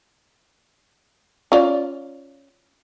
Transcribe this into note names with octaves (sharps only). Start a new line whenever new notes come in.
C#4 F4 D5